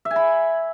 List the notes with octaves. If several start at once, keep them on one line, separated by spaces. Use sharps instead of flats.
E5
G#5
B5